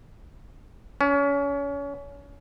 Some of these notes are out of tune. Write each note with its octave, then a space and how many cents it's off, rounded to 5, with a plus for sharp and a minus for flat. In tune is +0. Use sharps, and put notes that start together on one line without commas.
C#4 +30